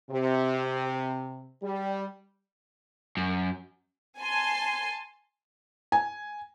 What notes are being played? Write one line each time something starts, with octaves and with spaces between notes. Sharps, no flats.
C3
G3
F#2
G#5 A5 C6
G#5